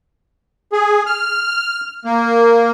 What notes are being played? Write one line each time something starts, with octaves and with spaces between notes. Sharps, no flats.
G#4
F6
A#3